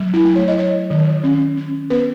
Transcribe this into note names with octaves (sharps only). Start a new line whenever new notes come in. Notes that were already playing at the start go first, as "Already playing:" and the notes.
Already playing: F#3
E4
A3
C#5
D#5
F#3 C#5
D#3
C#4
C#4
B3 B4